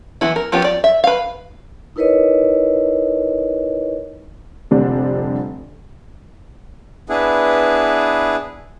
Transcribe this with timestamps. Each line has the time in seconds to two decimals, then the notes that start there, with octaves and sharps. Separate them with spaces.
0.21 E3 B3 E4
0.36 A#4
0.52 F3 B3 C#4 F4 G4
0.64 D5
0.84 E5
1.04 B4 F5
1.96 D#4 E4 A#4 B4 C#5 D#5
4.71 F1 F2 D3 G3 C4 D4
7.09 B3 D4 E4 G#4 B4